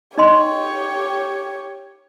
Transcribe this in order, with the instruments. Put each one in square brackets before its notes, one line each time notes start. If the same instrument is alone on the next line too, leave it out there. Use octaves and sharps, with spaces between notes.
[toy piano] D#4 D#5 C6 [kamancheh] G4 C#5